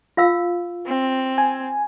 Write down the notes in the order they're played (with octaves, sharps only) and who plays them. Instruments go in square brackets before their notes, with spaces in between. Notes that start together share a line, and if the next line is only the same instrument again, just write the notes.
[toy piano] F4 F5 E6
[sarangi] C4
[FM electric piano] G#5